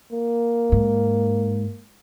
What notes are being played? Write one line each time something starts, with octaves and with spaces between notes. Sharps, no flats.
A#3
G#2